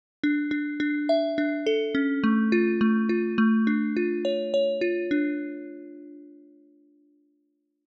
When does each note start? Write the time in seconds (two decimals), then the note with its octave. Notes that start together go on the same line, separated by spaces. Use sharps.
0.24 D4
0.51 D4
0.80 D4
1.09 E5
1.38 D4
1.66 A4
1.95 C#4
2.24 A3
2.52 F4
2.81 A3
3.09 F4
3.38 A3
3.67 D4
3.97 F4
4.25 C#5
4.54 C#5
4.81 F4
5.11 D4